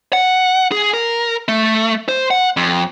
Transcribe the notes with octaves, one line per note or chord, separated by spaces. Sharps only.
F#5
G#4
A#4
A3
C5
F#5
F2